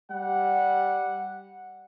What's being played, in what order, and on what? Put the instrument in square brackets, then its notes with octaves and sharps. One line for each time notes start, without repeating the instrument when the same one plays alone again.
[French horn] G3 [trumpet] F#5